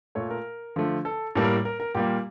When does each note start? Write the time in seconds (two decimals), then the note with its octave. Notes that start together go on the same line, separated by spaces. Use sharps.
0.15 A#2 A3 C#5
0.30 A#4
0.76 D3 F3 A3
1.05 A4
1.35 A2 G3 A#3 A4
1.45 A#4
1.65 A#4
1.80 A#4
1.95 A#2 G3 A#3 G4